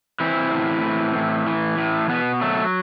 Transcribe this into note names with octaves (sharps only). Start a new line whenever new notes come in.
E3 C4 E4
A2
E3
A2
E3
A2
B2 B3
F#3 A3